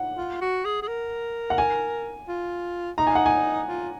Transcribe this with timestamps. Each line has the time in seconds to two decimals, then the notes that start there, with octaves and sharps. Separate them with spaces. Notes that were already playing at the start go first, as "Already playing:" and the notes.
Already playing: F#5
0.17 F4
0.41 F#4
0.65 G#4
0.82 G#4
0.88 A#4
1.50 F#5
1.58 G#5
2.28 F4
2.98 D#4 A#5
3.07 G#5
3.15 F#5
3.26 G#5
3.68 F4